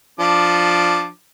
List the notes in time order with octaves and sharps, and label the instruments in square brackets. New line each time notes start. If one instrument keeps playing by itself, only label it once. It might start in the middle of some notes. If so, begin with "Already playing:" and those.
[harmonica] F3 D4 D6